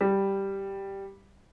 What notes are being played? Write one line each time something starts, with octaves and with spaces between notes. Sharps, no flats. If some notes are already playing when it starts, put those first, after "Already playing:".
G3